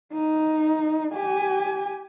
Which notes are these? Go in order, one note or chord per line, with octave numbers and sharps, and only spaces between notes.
D#4
G4 G#5